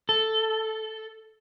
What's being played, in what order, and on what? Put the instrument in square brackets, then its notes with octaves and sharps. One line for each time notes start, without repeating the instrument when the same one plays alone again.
[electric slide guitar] A4